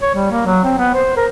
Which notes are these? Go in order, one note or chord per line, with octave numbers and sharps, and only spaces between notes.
C#5
G3
A#3
F#3
C4
B3
C5
A#4